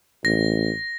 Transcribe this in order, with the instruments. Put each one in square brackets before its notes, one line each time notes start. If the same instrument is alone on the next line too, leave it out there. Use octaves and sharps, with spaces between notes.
[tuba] A1 [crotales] A#6